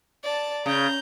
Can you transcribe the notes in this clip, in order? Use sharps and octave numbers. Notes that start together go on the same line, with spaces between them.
D5 A5
C#3 A#5 G6